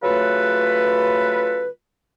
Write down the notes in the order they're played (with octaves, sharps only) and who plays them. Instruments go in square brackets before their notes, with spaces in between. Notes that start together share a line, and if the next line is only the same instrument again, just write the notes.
[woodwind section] C#3 F#3 A3 F4 A4 B4